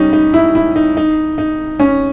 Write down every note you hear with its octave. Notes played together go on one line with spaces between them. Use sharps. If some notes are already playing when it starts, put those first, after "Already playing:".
Already playing: G3 C#4 D#4
D#4
E4
E4
D#4
D#4
D#4
C#4